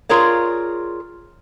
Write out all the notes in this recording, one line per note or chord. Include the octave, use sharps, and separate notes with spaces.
F4 G#4 A#4 C#5 D5